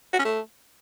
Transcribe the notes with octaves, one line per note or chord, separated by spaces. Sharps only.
F#4
C#4
A3